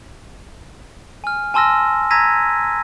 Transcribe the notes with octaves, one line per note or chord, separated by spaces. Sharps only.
G#5 F6
G#5 A5 C6 E6 F6 A#6
A#5 E6 G#6 A#6 B6 D#7